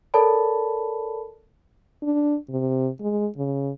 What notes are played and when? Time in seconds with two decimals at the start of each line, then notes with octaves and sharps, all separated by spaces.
0.14 A4 A#4 C#5 D5 A5 B5
2.03 D4
2.49 C3
3.01 G#3
3.37 C#3